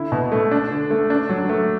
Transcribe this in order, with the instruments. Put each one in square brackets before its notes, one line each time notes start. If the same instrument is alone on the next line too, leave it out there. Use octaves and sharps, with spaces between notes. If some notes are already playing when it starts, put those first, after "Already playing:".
Already playing: [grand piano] D3 E4
B2
A3
D4
D3
A3
D4
F#3
A3